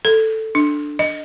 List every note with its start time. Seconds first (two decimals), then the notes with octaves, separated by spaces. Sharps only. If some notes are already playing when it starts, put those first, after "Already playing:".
0.05 A4
0.55 D4
0.99 D#5